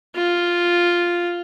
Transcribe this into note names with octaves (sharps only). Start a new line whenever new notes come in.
F4